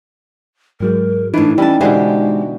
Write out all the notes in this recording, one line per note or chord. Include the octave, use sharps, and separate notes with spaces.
G#2 F#3 G#3 A#4
A2 E3 D4 D#4
E3 G3 C#4 A5
B2 D3 E3 G#3 G4 G#4 C5